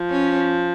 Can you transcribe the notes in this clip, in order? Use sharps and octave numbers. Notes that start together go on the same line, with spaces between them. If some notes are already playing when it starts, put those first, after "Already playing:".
Already playing: F3
C#4